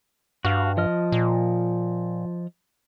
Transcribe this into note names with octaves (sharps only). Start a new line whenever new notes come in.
G2 F#4 F5
F3 D#5 F6
A#2